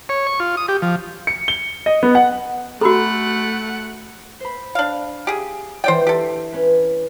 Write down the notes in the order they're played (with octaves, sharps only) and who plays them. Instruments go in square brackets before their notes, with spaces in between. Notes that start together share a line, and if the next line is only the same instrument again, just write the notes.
[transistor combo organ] C#5
C#6
F4
D#6
G4
F3
[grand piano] C#7
G7
D#5
B3
F#5
[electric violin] A3 F#5 [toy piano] F#4 A4 [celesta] A#5 B5 E6
[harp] C5 B5
[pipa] D4 F5
G4 G#4
[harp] E3 D4 [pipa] C5 D5 G5
[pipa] G4 A4
[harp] C#4 B4